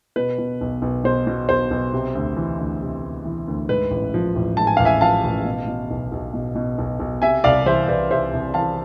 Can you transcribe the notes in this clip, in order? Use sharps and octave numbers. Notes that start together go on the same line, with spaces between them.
B2 B4
B2
B1
B1
B2 C5
B2
B1 C5
B1
C3
D2
E3
D2
C3
D2
E3
D2
G#2 B4
A1
F3
A1
G#2 A5
G#5
A1 F5
E5 G#5
F3 F5 A5
A1
B2
B2
B1
B1
B2
B2
B1
B1
C3 E5 G#5
C2 D5 F5
E3 C5 E5
C2 B4 D5
C3 C5 E5
C2
E3 F5 A5